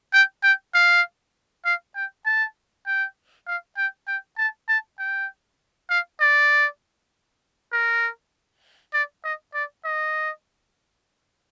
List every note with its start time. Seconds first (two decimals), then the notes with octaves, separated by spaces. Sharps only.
0.14 G5
0.43 G5
0.74 F5
1.65 F5
1.95 G5
2.26 A5
2.87 G5
3.47 F5
3.77 G5
4.08 G5
4.38 A5
4.69 A5
4.99 G5
5.90 F5
6.21 D5
7.72 A#4
8.94 D5
9.24 D#5
9.54 D5
9.85 D#5